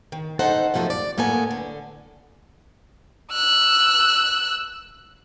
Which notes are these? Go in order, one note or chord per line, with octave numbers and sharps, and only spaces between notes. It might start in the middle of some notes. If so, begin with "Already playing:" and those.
D#3
D#4 A4 C5 F#5
F#2 C3 F3 A3 D#4
D5
A2 A#3 B3 A4 G#5
D3
E6 F#6